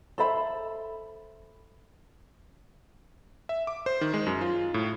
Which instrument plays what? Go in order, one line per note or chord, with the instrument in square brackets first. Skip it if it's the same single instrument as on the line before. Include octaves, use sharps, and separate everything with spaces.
[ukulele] A4 C5 E5 B5
[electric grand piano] E5
D6
C5
D#3
G#3
F#2
F4
A2